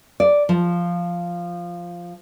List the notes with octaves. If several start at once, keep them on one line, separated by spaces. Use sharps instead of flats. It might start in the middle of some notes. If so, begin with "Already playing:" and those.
D5
F3